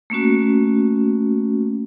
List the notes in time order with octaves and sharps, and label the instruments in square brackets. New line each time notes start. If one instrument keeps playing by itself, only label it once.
[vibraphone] A3 A#3 C#4 F#4